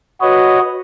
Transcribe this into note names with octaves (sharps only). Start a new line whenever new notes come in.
F#4 B4 C#5 D#5